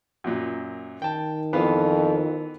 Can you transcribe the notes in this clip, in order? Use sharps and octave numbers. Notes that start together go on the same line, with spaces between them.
F#2 A#2
D#3 G5 A5
F2 E3 B3 F5